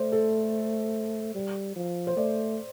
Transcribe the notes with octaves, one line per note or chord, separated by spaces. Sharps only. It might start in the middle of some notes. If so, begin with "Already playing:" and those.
Already playing: A3 C5 D5
A4
G3
F3
C5
A3 D5